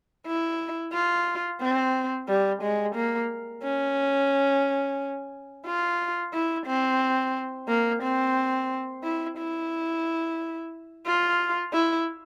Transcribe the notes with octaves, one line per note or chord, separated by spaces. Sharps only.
E4
F4
C4
G3
G#3
A#3
C#4
F4
E4
C4
A#3
C4
E4
E4
F4
E4